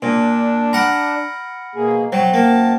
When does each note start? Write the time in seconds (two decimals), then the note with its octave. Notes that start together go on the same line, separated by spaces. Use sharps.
0.02 A#2 D4
0.73 F#5 A#5 B5 F6 D7
1.75 B2 A#3 G#4
2.12 B2 F#3 C5 F#5 G5
2.34 F#2 A#3 A5